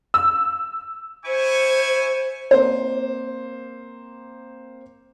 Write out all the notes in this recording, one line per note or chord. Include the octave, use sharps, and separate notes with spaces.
E6
E4 C5 G#5 C#6
A#3 C4 C5